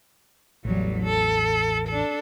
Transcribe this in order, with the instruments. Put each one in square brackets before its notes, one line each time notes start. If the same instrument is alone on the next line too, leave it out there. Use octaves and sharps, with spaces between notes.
[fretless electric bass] A1 E2 [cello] F#3 G3
[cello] A4
D4 A4